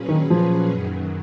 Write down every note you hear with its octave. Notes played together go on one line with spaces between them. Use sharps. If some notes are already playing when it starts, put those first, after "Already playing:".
Already playing: A#2 F#3 C#4 G#4 B4
D#3
F3
F#2 D#3 F#3